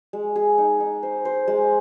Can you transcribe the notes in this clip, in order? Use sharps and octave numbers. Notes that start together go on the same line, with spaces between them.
G#3
G#4
D#4
D#4
C5
C5
G#3